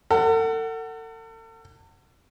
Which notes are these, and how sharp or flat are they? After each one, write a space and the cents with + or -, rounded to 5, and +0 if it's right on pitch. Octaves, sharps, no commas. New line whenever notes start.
A4 +40 F#5 +15